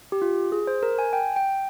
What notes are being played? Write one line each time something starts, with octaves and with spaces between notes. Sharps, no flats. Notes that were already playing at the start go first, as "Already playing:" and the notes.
G4
F4
G#4
C5
A#4
G#5
G5
G5